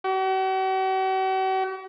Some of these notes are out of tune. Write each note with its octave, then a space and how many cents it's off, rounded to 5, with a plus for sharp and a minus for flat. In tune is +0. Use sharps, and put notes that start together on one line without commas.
F#4 +45